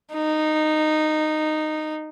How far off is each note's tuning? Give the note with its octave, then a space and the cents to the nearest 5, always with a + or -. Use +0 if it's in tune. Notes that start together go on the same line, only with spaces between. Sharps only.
D#4 -15